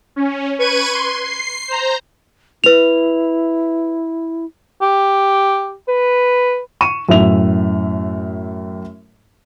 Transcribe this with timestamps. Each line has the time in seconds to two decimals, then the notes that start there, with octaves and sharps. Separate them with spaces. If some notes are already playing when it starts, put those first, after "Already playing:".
0.16 C#4
0.59 B4 C#6 G#6 D#7
0.93 C6
1.23 C7
1.68 C5 A#5
2.64 E4 B4 F7
4.82 G4
5.88 B4
6.81 C#6 D#7 E7
7.09 F#2 A2 E5 F7